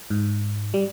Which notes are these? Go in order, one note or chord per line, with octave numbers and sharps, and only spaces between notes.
G#2
G3